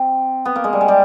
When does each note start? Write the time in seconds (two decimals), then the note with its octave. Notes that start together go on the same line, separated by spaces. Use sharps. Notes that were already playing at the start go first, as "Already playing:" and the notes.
Already playing: C4
0.45 B3
0.56 A#3
0.64 G#3
0.73 G3
0.81 G#3
0.88 G3